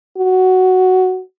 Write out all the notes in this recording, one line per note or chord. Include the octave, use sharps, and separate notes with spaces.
F#4